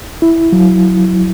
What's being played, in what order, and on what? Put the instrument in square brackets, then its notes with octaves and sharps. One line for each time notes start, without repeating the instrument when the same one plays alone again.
[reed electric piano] E4
F#3